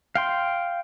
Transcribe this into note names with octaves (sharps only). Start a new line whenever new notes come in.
F5 G5 C6